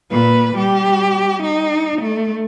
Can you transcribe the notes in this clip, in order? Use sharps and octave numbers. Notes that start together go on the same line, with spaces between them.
A#2 B4
G3 G4
D#4
A3